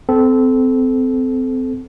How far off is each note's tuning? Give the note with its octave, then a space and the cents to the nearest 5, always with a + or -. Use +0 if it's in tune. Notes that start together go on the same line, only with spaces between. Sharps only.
C4 -25 A4 -20